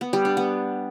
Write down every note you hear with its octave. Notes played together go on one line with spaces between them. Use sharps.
B3
G3
D4
B3